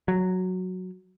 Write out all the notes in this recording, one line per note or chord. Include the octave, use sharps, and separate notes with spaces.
F#3